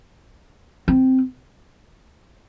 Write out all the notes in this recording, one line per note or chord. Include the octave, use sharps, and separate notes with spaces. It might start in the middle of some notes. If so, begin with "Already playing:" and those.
C4